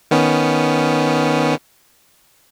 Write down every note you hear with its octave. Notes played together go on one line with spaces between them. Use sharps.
D#3 B3 C#4